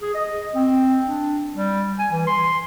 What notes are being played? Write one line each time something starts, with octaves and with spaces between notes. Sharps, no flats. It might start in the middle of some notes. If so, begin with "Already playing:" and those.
G#4
D#5
C4
D4
G3
G#5
E3
C6